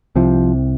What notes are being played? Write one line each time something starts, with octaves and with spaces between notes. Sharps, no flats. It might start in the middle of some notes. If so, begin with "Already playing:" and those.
C2 C3 F3